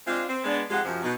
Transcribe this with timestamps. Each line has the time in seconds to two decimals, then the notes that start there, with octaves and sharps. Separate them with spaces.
0.06 G#3 C4 D4 F4
0.28 C4
0.43 G#3 B3 D4
0.70 F2 G#3 D#4 F4 G4 F#5
0.84 F#2 C3 F3
1.03 B2 D#4